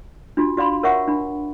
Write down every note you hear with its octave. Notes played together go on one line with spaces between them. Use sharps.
D4 F4 F#4
F#4 D5 F5 B5 C6
A#4 C#5 E5 F#5 C#6
D4 B5